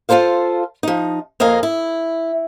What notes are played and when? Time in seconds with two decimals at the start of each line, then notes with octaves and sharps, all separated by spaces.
0.09 F4 F#4 A4 C5 F5
0.83 F3 D#4
1.40 F2 A#3 D#5 F5 G#5
1.63 E4